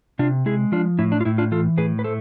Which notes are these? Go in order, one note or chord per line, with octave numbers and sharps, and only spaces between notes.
C3 D4 F4
G#3 E4 G#4
F3 D4 F4
A2 E4
D4
F4
A2 E4
D4 F4
E3 F4 A4
A2 G#4 B4
B4
A3 A4 C5